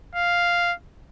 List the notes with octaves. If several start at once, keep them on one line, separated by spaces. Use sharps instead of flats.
F5